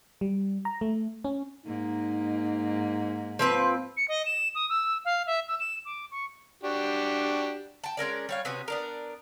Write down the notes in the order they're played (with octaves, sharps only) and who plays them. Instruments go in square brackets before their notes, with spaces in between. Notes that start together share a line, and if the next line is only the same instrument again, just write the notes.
[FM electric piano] G3
A#5
A3
C#4
[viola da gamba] G#2 A#3 [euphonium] D#4
[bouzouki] F3 C4 B4
[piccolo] C#7
D#5
E7
D#6
E6
F5
E5
E6
E7
D6
C#6
[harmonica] D4 F#4 G4
[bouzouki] G5 A5
G#3 C#4 A#4 D5
G3 C#5 F5
C3 B3 C#4 F#4
B3 D4 A#4